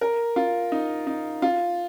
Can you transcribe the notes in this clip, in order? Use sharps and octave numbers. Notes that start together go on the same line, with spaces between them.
A#4
F4
D#4
D#4
F4